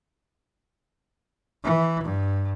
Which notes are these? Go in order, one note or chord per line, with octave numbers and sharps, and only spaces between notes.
E3
G2